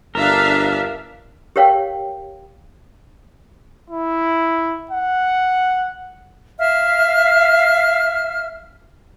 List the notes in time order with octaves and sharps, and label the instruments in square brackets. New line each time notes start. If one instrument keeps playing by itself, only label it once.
[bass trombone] G1 [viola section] D4 E5 F5 [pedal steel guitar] A#4
[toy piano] G4 A#4 C#5 F5 G5
[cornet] E4
F#5
[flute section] E5 F5 F6